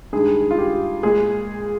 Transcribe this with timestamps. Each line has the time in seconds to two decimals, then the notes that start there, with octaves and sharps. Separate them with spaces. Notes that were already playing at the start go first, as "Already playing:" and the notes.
0.13 G2 D#3 G#3 G#4
0.51 F4
0.58 G4
1.03 A#2 G#3 G#4